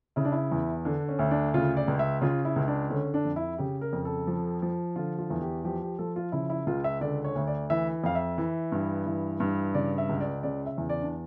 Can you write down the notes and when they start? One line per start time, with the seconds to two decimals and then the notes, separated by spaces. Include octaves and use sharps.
0.16 C#3 E4
0.25 D4
0.32 E4
0.52 E2
0.85 D3 D4
1.09 C#4
1.19 D2
1.31 D4
1.54 C#3 F4
1.77 D5
1.88 C#2
1.99 E5
2.21 C#3 F4
2.45 E4
2.56 C#2
2.68 D4
2.90 D3 C#4
3.14 D4
3.25 F2
3.36 E4
3.58 C#3 G4
3.81 A#4
3.93 F2
4.05 A4
4.27 F3
4.62 F3
4.96 D3 F4
5.19 F4
5.30 E2
5.41 G4
5.64 F3 G4
5.81 G4
5.99 F3 A4
6.16 F4
6.32 C#3 E4
6.50 E4
6.66 C#2 F4
6.84 E5
7.01 D3 D5
7.24 C#5
7.36 D2
7.47 D5
7.70 E3 E5
8.04 F2 F5
8.15 E5
8.38 E3
8.72 G2
9.06 E3
9.40 G2
9.74 C#3 D5
9.98 E5
10.09 C#2
10.20 D5
10.43 C#3 D5
10.66 E5
10.78 E2
10.89 D5
11.02 D4